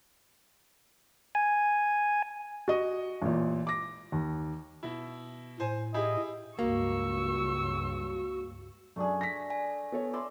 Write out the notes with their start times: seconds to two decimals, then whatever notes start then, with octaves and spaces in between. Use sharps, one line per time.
1.35 G#5
2.68 F#4 D#5 D#6
3.22 A1 A#2
3.67 D6 A#6
4.12 D#2
4.83 B2 E4
5.60 A2 C5 G#5
5.94 E4 G4 G#4 D#5
6.59 C#2 G2 A#3 F#4 C#6 E6
8.96 F#2 A3 D4 G#4
9.21 A#6 B6
9.50 G#5
9.92 B3 A4 C#5
10.13 D5 E5 C6